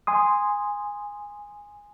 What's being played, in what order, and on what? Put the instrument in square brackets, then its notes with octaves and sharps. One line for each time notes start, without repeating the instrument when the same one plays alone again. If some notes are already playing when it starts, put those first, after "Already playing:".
[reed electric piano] G#5 C6 D#6